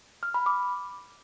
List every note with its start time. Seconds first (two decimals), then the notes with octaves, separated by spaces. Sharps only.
0.23 F6
0.34 B5
0.46 D6